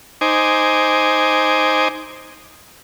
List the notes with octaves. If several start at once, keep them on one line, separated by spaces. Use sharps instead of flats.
D#4 C5 G#5 D6